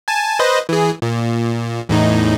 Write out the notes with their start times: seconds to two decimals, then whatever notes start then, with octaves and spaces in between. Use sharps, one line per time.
0.08 G#5 A5
0.39 B4 C5 D#5
0.69 E3 G#4
1.02 A#2
1.89 E2 A2 D#4